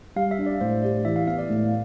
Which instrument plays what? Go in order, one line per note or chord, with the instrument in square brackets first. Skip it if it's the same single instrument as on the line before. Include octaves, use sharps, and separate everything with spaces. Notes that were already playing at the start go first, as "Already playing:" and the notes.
[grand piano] G3 [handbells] F5
[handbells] E5
[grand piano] D4
[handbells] D5
[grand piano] A2 [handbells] C5
[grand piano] G4 [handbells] D5
[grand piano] E3 [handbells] E5
[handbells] F5
[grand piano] B3 [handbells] F5
[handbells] D5
[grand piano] A2